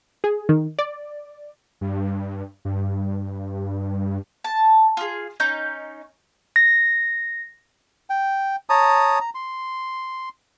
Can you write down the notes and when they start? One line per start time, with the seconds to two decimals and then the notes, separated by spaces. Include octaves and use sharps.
0.24 G#4
0.49 D#3
0.79 D5
1.81 G2
2.65 G2
4.44 A5
4.97 F4 G#4
5.40 C#4 D#4 G6
6.56 A#6
8.10 G5
8.70 C#5 A5 A#5 D#6
9.21 A#5
9.35 C6